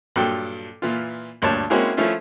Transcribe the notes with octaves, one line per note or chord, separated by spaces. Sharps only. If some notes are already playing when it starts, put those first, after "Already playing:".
G2 A#2 F#3 A4 G5
A#2 E3 F4
D2 G2 A#2 C#5 A5
G#3 A#3 C4 C#4 E4 F#4
F3 A3 C#4 E4 F4